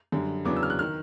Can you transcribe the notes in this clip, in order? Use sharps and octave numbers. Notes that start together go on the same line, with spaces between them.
F#2 D3 G3
E2 C#3 F#3 B3 D4 D6
E6
F6
F#6
D#3 F6